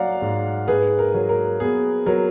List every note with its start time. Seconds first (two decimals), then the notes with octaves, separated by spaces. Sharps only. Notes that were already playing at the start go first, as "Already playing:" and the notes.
Already playing: F#3 D5 F5 F#5 A#5
0.22 G#2
0.68 G#2 G#4 B4
0.99 A#4
1.14 F#3
1.29 A#4
1.60 B3 G#4
2.06 F#3 A#4